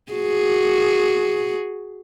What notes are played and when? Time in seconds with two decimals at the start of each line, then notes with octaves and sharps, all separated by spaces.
0.12 F#4 G#4